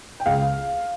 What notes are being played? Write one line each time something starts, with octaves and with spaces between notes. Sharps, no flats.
G5
C#2 F5